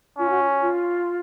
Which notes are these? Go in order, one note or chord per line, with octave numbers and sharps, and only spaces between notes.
C#4 F4
F#4
F4
F4